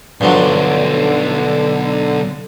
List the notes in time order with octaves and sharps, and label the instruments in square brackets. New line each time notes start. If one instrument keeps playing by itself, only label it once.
[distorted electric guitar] B1 D5 [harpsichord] G2 F3 F#3 [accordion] D3